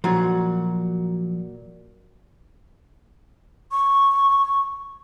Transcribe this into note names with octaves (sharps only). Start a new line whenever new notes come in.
A#2 F3 F#3 F#4
C#6